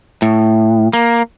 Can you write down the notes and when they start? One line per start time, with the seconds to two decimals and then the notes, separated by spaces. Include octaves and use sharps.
0.22 A2
0.93 A#3